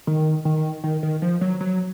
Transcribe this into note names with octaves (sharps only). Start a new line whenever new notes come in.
D#3
D#3
D#3
D#3
F3
F#3
F#3